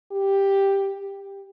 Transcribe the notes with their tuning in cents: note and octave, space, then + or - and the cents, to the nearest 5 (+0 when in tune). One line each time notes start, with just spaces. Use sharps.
G4 +5
G4 +15